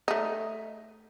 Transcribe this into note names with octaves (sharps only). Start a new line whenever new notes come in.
A3 D#4